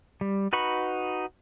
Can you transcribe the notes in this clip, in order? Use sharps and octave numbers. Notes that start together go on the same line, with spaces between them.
G3
D#4 F#4 B4 B5 C#6